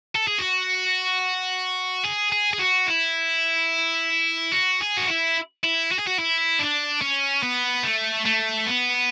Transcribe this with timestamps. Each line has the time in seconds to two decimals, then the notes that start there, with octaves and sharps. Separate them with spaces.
0.15 A4
0.27 G#4
0.38 F#4
2.04 G#4
2.32 G#4
2.53 G#4
2.59 F#4
2.87 E4
4.52 F#4
4.80 G#4
4.97 F#4
5.07 E4
5.64 E4
5.91 F#4
5.99 G#4
6.07 F#4
6.19 E4
6.59 D4
7.01 C#4
7.43 B3
7.83 A3
8.25 A3
8.67 B3